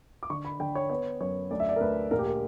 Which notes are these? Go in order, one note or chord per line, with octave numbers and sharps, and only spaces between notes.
D6
D3 C#6
B5
D3 G5
C#5
B3 C#5
F#2 C#5
D2 D5
E5
D5
A#4
D2 B4
A#1 A#4
G4
A#4